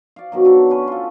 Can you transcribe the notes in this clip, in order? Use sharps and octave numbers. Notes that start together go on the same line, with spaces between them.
D5 F5
B2 D#3 F#3
D3 A4
C#4 B4
F4 A4